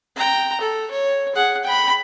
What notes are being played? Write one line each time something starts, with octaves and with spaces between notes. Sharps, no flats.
G5 A#5
A4
C#5
G#4 F#5
G5 B5